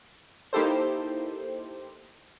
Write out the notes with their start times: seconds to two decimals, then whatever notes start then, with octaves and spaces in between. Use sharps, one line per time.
0.53 A#3 D#4 E4 G4 A4 C5